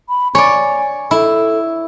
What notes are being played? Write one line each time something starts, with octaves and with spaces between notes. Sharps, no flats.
B5
C#5 D5 G#5
E4 A4